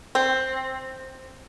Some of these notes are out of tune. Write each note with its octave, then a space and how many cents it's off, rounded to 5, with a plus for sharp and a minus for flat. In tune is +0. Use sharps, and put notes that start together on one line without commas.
C4 +5